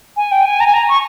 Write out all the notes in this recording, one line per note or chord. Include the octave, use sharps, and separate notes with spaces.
G#5
G5
G#5
A#5
G#5
A#5
C#6